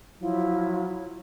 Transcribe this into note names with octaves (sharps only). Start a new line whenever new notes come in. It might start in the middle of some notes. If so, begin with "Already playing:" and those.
F3 F#3 E4